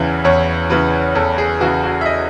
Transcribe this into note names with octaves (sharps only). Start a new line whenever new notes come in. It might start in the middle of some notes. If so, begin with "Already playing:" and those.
Already playing: E2 C#3 E3 E5
E2 C#5
C#3 E3 B4
E2 A4
G#4
C#3 E3 F#4
F#4
E5
D#5